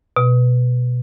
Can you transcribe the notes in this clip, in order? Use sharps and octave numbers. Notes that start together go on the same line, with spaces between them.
B2